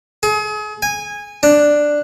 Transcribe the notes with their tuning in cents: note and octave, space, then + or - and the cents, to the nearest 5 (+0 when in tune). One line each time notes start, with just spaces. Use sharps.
G#4 +35
G#5 -15
D4 +5